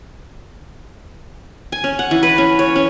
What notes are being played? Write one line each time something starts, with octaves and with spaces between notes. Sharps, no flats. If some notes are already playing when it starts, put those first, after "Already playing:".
G#5
C#4
F#5
E3
B4
C#4
C#5
C#4